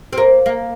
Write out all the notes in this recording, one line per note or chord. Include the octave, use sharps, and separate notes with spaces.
C4
A#3
A#3